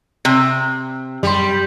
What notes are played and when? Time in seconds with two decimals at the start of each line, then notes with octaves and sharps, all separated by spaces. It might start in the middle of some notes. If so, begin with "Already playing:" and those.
0.25 C3
1.23 F#2 G3 C6